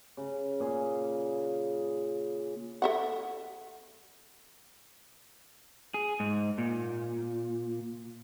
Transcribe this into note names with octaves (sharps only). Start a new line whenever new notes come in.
C#3
A#2 G#4
A4 E5 F#5
G#4
G#2
A#2